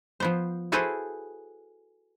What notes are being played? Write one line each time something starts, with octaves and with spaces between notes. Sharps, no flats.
F3 B3 C5
E4 F#4 G#4 A4 B4 C5